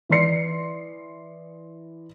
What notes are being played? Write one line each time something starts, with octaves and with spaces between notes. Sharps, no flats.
E3 D5 C6 C7 C#7